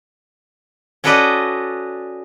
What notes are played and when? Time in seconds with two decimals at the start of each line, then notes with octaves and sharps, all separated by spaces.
1.04 C#4 F#4 A4 B4 D5 D#5